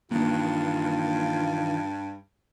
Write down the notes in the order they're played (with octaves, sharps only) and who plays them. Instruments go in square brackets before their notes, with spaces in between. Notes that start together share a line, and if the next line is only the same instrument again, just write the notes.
[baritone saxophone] G2 [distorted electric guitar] D#3 E3 [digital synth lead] A#3 [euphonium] F4